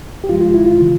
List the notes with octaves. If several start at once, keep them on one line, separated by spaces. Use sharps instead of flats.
G4
G2 F3 G#3 F4
F4
E4
F4
C#3 E3